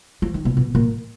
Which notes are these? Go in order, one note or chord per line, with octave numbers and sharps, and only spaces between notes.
F3
D#3
B2
B2
A#2